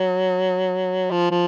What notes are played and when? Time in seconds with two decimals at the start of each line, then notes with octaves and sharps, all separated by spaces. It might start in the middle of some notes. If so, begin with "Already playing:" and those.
Already playing: F#3
1.11 F3
1.31 F3